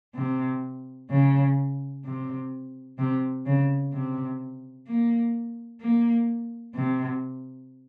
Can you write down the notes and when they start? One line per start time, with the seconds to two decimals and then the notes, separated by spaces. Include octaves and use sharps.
0.15 C3
1.10 C#3
2.05 C3
2.98 C3
3.46 C#3
3.94 C3
4.87 A#3
5.81 A#3
6.76 C3